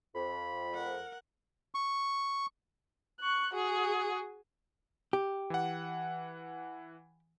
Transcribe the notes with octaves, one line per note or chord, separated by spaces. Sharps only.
F2 B5
A#4 F#5
C#6
C#6 F#6
F#4 G#4
G4
E3 F#5